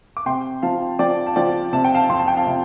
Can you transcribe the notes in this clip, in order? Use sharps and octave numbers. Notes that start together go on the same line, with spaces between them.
D6
C3 G5 C6
F3 F5 A5
F3 D5 G5
A5
F3 D5 G5
C3 A5
G5
F5 A5
F2 C6
A5
G5
F5 A5
C3